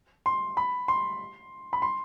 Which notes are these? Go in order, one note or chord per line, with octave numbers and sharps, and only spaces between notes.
C6
B5
C6
B5
C6